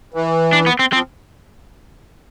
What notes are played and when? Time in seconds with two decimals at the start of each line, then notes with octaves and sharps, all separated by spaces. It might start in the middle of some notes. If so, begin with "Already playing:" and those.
0.14 E3
0.53 D4
0.66 B3
0.79 C4
0.93 F3 C4